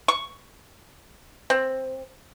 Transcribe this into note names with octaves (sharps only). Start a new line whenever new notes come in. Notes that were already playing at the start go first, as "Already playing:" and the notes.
C#6
C4